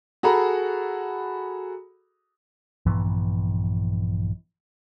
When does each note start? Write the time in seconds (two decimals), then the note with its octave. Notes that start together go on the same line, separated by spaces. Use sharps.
0.23 F#4 G#4 A4 A#5 B5
2.86 A#1 G2 E3 B3